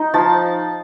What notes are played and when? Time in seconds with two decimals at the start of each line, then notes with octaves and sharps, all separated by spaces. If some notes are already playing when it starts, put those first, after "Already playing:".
Already playing: D#4
0.14 F3 A5